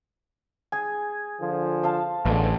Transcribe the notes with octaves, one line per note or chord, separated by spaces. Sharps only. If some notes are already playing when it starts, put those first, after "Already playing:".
G#4 G#5
D3 F3 F4
C5 F5 A5
A1 D3 G#3 B3